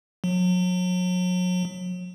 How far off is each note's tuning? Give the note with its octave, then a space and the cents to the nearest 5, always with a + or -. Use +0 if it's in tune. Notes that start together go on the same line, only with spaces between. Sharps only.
F#3 -35